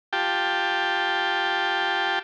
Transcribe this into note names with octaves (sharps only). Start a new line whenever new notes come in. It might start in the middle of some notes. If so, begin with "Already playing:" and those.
F4 G4 G5 A5